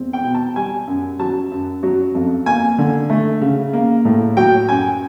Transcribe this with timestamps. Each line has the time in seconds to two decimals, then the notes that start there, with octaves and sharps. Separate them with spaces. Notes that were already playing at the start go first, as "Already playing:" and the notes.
Already playing: E2 C4
0.13 G5
0.24 B2
0.35 A5
0.56 G3 G#5
0.87 F#2
1.19 F#3 A5
1.51 F#2
1.83 F#3
2.15 F2
2.46 A#3 G#5
2.78 D3
3.10 A3
3.41 C#3
3.73 A#3
4.05 A2
4.37 F#3 G5
4.69 F#2 G#5